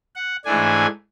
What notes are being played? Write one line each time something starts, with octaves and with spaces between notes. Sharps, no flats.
F#5
G#2 E3 A3 D4 G#5